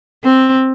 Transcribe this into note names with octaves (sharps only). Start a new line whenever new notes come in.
C4